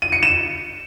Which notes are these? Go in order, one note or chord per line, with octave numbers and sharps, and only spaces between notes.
D#7
C#7
E7